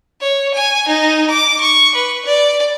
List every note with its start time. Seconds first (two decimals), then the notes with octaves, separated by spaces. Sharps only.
0.21 C#5
0.54 G#5
0.88 D#4
1.30 D6
1.60 C#6
1.94 B4
2.25 D5